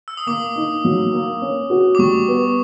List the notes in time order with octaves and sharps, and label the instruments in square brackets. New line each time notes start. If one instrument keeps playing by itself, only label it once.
[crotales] E6
D#6
[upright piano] A#3 [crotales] D6
[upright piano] D#4
F#3
A#3
C#4
F#4
[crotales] D6
[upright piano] G3 [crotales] C#6
[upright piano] B3